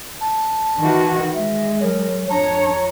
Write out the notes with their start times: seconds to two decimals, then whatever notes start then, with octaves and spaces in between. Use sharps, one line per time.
0.21 A5
0.79 D#3 E3 F#4
1.34 G#3 E5
1.82 F#3 A#4
2.30 F2 D4 C#5 A#5